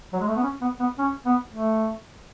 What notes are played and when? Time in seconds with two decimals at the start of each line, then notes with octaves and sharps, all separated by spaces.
0.13 F#3
0.20 G#3
0.27 A3
0.36 B3
0.43 C#4
0.61 B3
0.80 B3
0.98 C#4
1.26 B3
1.54 A3